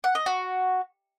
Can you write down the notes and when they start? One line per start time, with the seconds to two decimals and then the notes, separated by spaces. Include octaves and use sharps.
0.04 F#5
0.15 D#5
0.26 F#4